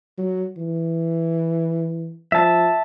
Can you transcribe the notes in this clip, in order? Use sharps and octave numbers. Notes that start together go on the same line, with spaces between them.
F#3
E3
F3 E5 A5